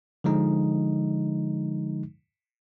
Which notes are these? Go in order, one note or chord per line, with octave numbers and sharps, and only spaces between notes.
D3 F3 G#3 D#4